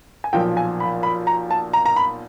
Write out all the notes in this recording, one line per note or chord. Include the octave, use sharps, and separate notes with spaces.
G#5
B1 A#2 F3 G5
G#5
B5
B5
A#5
A5
A#5
A#5
B5